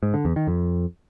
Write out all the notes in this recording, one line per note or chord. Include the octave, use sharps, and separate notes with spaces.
G#2
D3
E2
D#3
F2